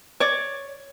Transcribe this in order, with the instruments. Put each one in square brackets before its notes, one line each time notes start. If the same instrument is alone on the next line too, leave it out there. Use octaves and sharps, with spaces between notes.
[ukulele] C#5 D5